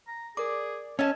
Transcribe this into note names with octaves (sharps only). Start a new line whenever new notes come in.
A#5
G#4 A#4 D5 D6
C#4 D#5 E5 G#5 A5